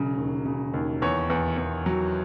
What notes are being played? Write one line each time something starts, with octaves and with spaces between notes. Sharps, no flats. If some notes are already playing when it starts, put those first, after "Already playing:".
Already playing: E1 C#3 F#3
D#2
C#3
D#2
E2 C#5
E2
E2
F#3